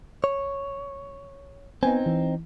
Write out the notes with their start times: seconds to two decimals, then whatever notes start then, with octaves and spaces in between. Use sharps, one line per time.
0.24 C#5
1.83 B3 C4 D#4 G#5
2.06 E3